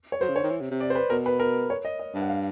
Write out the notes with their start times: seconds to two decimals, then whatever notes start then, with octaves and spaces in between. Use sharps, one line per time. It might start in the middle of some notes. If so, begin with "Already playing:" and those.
0.12 C#5
0.21 F#3 C5
0.29 C#3
0.36 D3 C#5
0.44 D#3
0.51 E3
0.61 C3
0.71 C3
0.80 D5
0.90 C5
0.95 B4
1.10 B2 A#4
1.26 B4
1.40 A#4
1.70 C#5
1.85 D#5
1.99 D#5
2.15 G2
2.21 F#5
2.30 F5